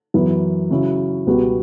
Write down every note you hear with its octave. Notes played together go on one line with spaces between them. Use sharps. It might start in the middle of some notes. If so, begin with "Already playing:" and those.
F#2 E3 B3
C#3 F#3 C#4 E4
C#2 B2 G3 B3 F#4